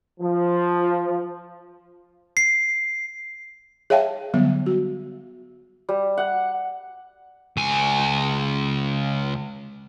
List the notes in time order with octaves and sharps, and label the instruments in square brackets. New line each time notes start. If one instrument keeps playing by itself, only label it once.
[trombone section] F3
[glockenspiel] C7
[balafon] G#4 C#5 E5 F5 G5 A5
D3 F#3 G3 B3
F#4
[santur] G3
F#5
[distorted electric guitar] C#2 G#5